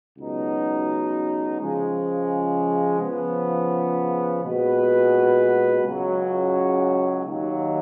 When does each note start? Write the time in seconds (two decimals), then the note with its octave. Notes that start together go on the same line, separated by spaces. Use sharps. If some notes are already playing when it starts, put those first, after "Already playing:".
0.18 C#2 B2 F#3 B3 D#4
1.60 C#3 F3 G#3
3.01 C#3 F3 B3
4.42 A#2 G#3 B3 F#4 B4
5.84 C#2 C#3 F#3
7.25 D#2 D#3 F#3